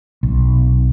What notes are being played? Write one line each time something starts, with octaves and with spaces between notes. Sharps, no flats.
B1